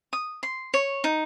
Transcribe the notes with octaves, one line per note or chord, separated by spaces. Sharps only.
D#6
C6
C#5
D#4